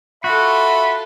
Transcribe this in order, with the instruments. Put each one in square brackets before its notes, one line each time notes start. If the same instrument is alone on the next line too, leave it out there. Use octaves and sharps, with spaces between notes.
[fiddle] F4 A4 [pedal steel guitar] F#4 [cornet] E5 [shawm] B5